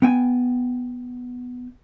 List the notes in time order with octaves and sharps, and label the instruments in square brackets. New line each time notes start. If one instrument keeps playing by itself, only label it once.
[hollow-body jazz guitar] B3 G5 G#5